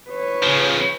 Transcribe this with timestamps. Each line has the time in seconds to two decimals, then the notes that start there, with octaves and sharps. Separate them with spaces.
0.10 B4 C#5
0.43 C#3 F3